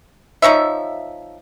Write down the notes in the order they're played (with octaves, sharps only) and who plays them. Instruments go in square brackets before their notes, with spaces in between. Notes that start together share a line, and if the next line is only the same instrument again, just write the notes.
[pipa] F3 D#4 C#5 E5